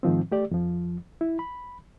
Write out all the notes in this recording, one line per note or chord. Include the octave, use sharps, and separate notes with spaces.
G#2 D#3 F3 C4
A3 G4 D5
F2 F3
E4
B5